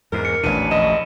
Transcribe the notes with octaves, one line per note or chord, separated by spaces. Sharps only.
E2 G#2 A#4
C#7
A1 D#2 A#2 D4 B4 C#5 D#7
A#1 D#5 E7